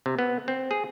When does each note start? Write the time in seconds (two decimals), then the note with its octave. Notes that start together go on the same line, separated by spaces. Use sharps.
0.06 C3
0.19 B3
0.48 C4
0.71 G#4